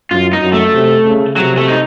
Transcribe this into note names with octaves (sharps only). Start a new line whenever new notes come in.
F#2 F4
D#4
F#2
A3
C3
C#3
C3 F#3
A3
D#4